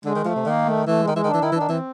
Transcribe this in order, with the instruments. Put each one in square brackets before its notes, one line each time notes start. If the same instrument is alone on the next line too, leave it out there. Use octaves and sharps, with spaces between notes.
[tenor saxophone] D3 [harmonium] G#3
[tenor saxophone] D#3
[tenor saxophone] F3 [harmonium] A3
[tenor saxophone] C3
[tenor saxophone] D#3 [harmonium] A#3
[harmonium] A3
[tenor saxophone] E3 [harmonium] A3
[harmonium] G#3
[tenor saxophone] D#3
[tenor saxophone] E3 [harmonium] G#3
[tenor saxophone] D#3 [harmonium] D4
[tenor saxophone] E3
[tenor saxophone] D#3 [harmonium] E4
[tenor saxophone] E3 [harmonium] D4
[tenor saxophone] D#3
[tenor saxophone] E3 [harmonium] C4